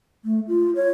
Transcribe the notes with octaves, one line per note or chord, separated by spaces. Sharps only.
A3
F4
C#5